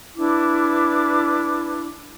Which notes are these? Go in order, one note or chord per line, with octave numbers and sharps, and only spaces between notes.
D4 E4 B4 D6